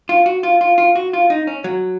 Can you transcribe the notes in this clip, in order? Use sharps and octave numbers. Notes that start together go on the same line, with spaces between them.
F4
F#4
F4
F4
F4
F#4
F4
D#4
C#4
F#3